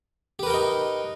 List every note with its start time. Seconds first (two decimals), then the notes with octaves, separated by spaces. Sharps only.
0.39 G4
0.43 B4
0.47 A#4
0.50 G5
0.54 D#4